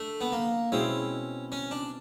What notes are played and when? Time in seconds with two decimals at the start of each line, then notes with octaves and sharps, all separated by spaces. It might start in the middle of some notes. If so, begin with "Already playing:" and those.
Already playing: A3 D4
0.21 B3
0.32 A#3
0.72 B2 G#3 C4 C#4 E4
1.52 C#4
1.71 D4